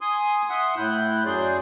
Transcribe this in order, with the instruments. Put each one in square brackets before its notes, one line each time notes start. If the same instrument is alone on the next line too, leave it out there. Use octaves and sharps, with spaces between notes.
[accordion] G#5 C6 D#6
E5 F#5 C6 D#6
A2 E4 F#6 G6
F#2 F#3 G#4 D5 C6 G6